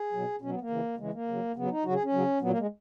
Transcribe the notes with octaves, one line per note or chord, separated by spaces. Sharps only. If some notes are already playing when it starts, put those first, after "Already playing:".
Already playing: G#4
B2 F#3
B2 F#3 C#4
B3
A#3
C#3 E3
C#3 E3 G#3
A#3
C#3 F#3
C#3 F#3 B3
D#4
C#3 F#3 F#4
G#4
C#4
C#3 F#3
A#2 F#3 B3
A#3
G#3